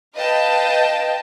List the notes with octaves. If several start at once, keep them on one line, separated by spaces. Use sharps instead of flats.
B4 D#5 F5 G5 A5